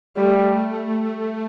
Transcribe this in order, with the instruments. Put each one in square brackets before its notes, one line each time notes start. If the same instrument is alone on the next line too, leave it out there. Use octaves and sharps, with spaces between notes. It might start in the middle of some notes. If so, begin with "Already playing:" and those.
[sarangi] G3 [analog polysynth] A3